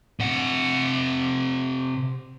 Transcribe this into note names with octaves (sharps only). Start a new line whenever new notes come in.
C3 F#5